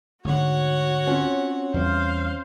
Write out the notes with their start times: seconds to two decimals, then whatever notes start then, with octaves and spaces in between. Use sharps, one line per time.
0.25 D2 G#2 D3 F#4 C#5 F#5
1.07 C4 C#4 F4
1.74 E2 G3 C5 F5